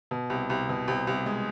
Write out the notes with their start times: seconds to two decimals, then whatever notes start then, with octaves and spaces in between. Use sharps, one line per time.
0.11 B2
0.30 C2
0.50 C2
0.69 B2
0.88 C2
1.07 C2
1.26 G#3